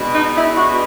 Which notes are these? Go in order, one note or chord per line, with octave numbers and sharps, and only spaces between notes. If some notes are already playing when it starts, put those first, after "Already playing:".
Already playing: B2 G#3 B3 D4
D#4
E4
F#4